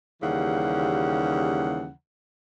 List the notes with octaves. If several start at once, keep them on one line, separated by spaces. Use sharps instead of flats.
D#2 C#3 E3 G3 F#5